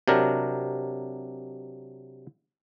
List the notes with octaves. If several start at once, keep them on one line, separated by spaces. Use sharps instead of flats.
C3 F#3 D4 A#4